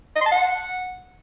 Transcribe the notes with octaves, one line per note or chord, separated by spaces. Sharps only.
D#5
C6
A5
F#5